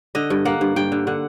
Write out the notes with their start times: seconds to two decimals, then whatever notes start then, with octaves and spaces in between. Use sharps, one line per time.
0.15 D3 D#5
0.30 G2
0.45 A#3 F#5
0.61 G2
0.76 G2 G5
0.92 D3
1.07 D3 F#5